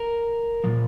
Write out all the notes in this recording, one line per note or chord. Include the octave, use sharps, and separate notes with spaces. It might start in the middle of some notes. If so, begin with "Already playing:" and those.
Already playing: A#4
A#2 F3